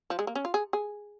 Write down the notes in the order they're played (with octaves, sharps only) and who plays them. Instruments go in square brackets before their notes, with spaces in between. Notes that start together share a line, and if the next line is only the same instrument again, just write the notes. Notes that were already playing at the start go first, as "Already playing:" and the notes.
[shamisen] F3
G#3
A#3
C#4
F4
G#4
G#4